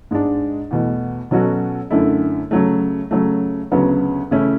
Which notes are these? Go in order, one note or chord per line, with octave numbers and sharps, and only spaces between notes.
G#2 G#3 D4
E2 B2 A3
B2 F#3 C#4 F#4 A4
F#2 D3 A3 E4
C#3 F#3 A3
C#3 F#3 A3
D2 C#3 F#3 B3
C#3 E3 A3 C#4 E4